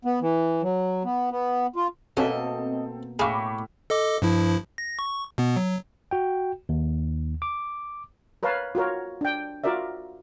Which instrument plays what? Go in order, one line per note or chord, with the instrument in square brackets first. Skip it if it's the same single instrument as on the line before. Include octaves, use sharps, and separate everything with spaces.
[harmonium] B3
E3
F#3
B3
B3
F4
[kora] B2 A#3 E5 [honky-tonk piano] C4 A4 [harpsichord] C#4 [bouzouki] D#5
[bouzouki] A2 [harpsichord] G#4 F5 [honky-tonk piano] B5 C#6 D6
[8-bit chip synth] A4 D#5 D6
G2 F3 E4
A#6
C#6
B2 B3
F#3
[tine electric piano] F#4 G5
D#2
D6
[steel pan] A#4 B4 C#5 F5 A5
F4 F#4 A#4 C#5
D4 G5
F4 F#4 A#4 D5 E5